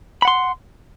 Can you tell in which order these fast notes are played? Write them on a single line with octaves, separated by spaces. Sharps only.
B5 F#5 C6